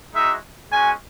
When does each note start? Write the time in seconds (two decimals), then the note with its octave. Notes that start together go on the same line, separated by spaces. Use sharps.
0.14 G#3 D#4 F#4 E5
0.71 G#3 C#4 F#4 G#5